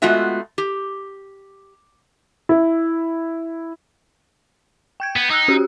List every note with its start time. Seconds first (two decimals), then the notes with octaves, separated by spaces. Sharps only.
0.02 G#3 A3 B3 F4 F#4 E5
0.58 G4
2.49 E4
5.00 G5 G6 G#6
5.16 B3
5.30 D#4 D#6 E6 F#6
5.48 C#4 F#4 G4